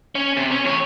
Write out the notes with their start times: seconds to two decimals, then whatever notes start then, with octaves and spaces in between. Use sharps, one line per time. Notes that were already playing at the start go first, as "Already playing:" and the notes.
0.15 C#4
0.37 C3
0.51 C#4
0.64 E2 C#5